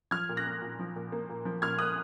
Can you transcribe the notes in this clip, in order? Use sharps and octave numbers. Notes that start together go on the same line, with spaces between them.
F3 F6 G#6
A#2
F#6 A#6
A#3
A#2
F3
A#2
A#3
A#2
F3
A#2 F6 G#6
A#3 D#6 F#6